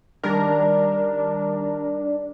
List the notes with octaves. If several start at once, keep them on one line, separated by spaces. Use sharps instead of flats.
D#3 G3 D4 A#4